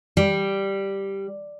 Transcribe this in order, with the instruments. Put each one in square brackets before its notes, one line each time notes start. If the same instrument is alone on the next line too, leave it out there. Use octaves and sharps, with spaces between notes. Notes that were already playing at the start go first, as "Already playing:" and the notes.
[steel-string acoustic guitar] G3